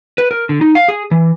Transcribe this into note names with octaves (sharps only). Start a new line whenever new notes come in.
B4
A#4
D3
D#4
F5
G#4
E3